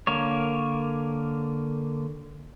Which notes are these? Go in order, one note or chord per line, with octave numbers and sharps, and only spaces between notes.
D3 A#3 A#4 C#5